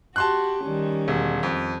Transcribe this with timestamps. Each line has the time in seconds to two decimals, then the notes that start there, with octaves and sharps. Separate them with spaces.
0.16 F#4 G4 A5 C6 F#6
0.64 D#3 G3 C#4
1.08 E1
1.43 F2